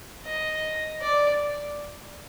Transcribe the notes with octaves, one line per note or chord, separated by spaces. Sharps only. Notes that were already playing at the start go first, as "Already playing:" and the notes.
D#5
D5